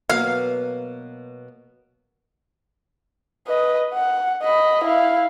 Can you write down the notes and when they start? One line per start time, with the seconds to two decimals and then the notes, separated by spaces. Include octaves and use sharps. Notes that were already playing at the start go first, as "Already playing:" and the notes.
0.09 B2 F#3 A#3 F5
3.47 B4 D#5
3.94 F#5
4.42 D#5 B5
4.85 E4 F5